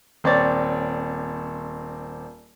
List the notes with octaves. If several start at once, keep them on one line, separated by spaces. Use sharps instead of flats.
D#1 C4 C#5 D5 A6